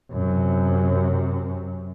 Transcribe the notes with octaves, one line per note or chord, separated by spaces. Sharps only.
F#2 C3